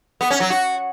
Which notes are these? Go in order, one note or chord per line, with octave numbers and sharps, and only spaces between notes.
B3
C#4
F#3
F#4